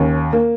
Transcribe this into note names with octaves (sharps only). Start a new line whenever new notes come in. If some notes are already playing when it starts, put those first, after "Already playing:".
Already playing: D#2 C#4
A#3